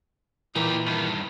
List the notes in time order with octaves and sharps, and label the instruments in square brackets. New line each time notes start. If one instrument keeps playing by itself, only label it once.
[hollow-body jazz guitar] A#2 E3 A#3 [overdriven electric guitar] D#4 G4
[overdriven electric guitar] G2 D#3